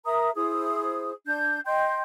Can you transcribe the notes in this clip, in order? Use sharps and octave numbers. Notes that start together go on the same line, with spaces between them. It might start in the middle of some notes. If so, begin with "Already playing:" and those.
A#4 E5 A#5 D#6
E4 G#4 C5 D#6
D4 G6
D#5 G5 C6 G6